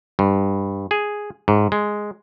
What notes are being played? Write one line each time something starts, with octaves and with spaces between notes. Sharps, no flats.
G2
G#4
G#2
G#3